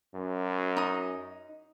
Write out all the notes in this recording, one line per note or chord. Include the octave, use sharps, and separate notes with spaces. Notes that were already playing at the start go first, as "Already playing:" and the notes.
F#2
D#4 D#6